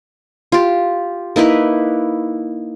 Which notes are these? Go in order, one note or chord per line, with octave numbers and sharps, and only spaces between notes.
F4 G4
A#3 D#4 E4 B4